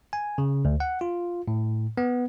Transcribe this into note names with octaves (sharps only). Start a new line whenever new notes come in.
G#5
C#3
D2
F#5
F4
A2
B3